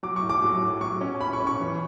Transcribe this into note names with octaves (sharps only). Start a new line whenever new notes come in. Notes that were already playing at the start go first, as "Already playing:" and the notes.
F#3 D6
C#6
A2
D6
F#3
A2
F#3 C#6
C#4
C#4 B5
C#6
C#4
C#6
E3